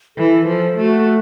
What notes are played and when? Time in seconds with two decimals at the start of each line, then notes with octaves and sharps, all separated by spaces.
0.18 E3 A4
0.47 F3 A4
0.77 A3 F#4